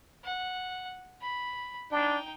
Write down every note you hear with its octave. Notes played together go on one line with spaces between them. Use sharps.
F#5
B5
D4 D#4 G5